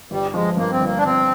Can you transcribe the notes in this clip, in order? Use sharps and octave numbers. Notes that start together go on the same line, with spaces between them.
G1 G3
F3 G#3
G2 A#3
C4
G1 A#3
D4
G1 C4